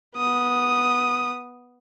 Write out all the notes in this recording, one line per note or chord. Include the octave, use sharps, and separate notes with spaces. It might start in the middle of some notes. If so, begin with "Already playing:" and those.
B3 D#6